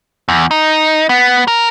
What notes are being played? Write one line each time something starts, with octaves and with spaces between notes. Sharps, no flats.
E2
D#4
B3
A#4